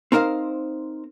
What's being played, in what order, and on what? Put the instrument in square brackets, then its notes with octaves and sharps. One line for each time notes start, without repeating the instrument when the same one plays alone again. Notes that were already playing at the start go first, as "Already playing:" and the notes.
[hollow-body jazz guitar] C4 D#4 A#4 C5 F5